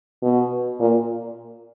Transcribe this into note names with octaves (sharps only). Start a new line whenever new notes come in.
B2
A#2